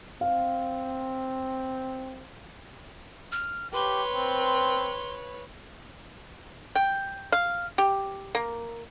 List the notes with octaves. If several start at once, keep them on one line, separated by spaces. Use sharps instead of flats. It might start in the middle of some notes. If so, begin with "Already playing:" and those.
C4 F5
F6
G4 B4 C#5 C6
C4
G5
F5
G4
A#3